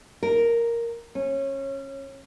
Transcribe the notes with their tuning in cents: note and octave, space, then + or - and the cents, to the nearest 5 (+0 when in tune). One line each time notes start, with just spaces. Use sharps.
A#4 +0
C#4 -20